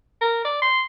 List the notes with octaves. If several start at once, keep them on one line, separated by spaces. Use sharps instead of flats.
A#4
D5
C6